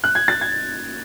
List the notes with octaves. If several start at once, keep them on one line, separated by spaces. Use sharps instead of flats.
F#6
G#6
A6
G#6